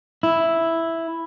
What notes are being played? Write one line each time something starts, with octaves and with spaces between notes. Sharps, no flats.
E4